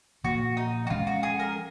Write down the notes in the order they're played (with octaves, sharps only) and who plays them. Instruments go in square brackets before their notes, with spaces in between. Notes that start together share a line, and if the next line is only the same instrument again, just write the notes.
[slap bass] A#2 F3 A#3 [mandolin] F#4
[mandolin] D#4
F#4
[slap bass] F3 G#3 C#4 [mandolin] F4
[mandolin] F#4
G#4
A#4